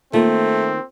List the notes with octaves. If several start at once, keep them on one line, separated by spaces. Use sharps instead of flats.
D#3 A3 A#3 C4 F4